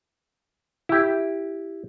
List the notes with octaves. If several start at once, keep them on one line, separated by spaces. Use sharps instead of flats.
E4 G4